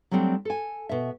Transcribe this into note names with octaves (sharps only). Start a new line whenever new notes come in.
F#3 G3 A3 C4 D4
A4 G#5
B2 E5